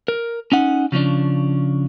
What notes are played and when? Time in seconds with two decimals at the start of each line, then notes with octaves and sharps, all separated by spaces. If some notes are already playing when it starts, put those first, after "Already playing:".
0.08 A#4
0.52 C#4 D#4 F#5
0.92 C#3 F3 C#4 D4